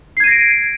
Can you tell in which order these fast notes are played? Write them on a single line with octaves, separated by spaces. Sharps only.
C7 G#6 D#7 A#6 D7